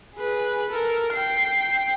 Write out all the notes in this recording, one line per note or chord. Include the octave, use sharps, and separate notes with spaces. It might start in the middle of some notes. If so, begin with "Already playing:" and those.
G#4 B4
A4 A#4
G5 C7